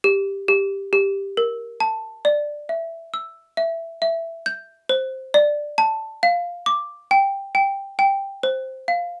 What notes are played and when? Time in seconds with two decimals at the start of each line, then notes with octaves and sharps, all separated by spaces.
0.04 G4
0.48 G4
0.93 G4
1.37 A#4
1.80 A5
2.25 D5
2.69 E5
3.14 E6
3.57 E5
4.02 E5
4.46 G6
4.89 C5
5.34 D5
5.78 A5
6.23 F5
6.66 D6
7.11 G5
7.55 G5
7.99 G5
8.43 C5
8.88 F5